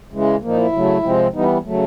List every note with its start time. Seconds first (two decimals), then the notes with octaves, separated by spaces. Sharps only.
0.12 C#3 E3 G#3
0.42 A#2 F3 A#3 D#4
0.58 E4
0.72 C#3 F#3 A3
1.03 C3 F3 G#3 C4
1.34 E3 G3 B3 D#4
1.65 C#3 F#3 A3